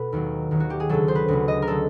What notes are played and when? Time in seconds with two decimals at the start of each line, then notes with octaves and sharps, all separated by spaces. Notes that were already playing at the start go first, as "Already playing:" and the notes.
Already playing: B2 A4 B4
0.13 D#2 D#3 F#3
0.51 D#2 D#3 F#3
0.60 F#4
0.70 G4
0.80 G#4
0.89 D2 C#3 F#3 A4
1.08 C5
1.15 B4
1.28 D2 C#3 F#3
1.48 D#5
1.62 A#4
1.67 D3 F#3 A4